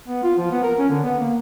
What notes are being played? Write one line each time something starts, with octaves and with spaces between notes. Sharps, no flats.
B3
F4
F3
B3
A#4
C#4
D3
B3
A#3